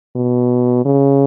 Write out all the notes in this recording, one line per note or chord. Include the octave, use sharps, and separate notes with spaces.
B2
C#3